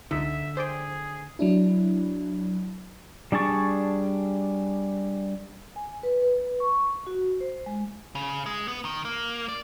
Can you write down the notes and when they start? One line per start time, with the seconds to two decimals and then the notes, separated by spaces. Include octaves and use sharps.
0.11 G1 C#2 D3 D#4 E5
0.57 G#4 C5 D5 G5
1.39 F#3 D4 E4
3.32 G3 D4 G#4 A5 C#6
5.76 G#5
6.03 B4
6.22 B4
6.60 C#6
7.07 F#4
7.41 C5
7.66 G#3
8.15 C#3
8.46 G#3
8.68 B3
8.85 D#3
9.05 A#3
9.49 D5